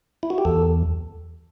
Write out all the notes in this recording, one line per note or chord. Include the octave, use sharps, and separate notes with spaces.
E4
F#4
G4
E2 A4